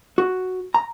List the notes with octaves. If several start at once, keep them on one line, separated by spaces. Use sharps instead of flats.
F#4
A#5